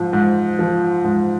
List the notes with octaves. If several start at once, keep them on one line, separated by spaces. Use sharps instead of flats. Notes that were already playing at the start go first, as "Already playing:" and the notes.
Already playing: G#2 F3
G#2
F3
G#2